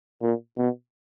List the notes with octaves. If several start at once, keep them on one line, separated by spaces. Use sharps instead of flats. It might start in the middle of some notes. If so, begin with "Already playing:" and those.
A#2
B2